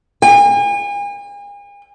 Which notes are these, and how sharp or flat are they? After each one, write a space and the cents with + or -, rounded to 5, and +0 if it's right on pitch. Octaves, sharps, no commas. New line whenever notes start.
G#5 -40